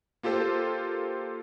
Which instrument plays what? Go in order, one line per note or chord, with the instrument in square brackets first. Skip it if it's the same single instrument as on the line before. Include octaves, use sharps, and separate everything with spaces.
[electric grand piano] A#3 F4 G4 A4 C5